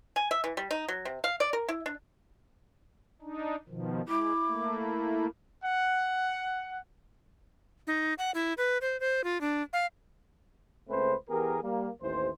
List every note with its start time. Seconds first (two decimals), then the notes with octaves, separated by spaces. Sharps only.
0.16 G#5
0.31 E5
0.44 E3
0.57 G3
0.71 D#4
0.88 F#3
1.05 C3
1.24 F5
1.40 D5
1.53 A#4
1.69 E4
1.86 D4
3.22 D4 D#4
3.68 B2 D#3 F3
4.08 G#3 E4 D6
4.47 A3 A#3
5.63 F#5
7.87 D#4
8.18 F#5
8.34 E4
8.58 B4
8.81 C5
9.00 C5
9.24 F4
9.41 D4
9.73 F5
10.89 C#2 C#3 A3 C4 B4 C5
11.30 E3 B3 G4 G#4 A#4
11.63 G3 A#3
12.02 A1 D#2 E3 C5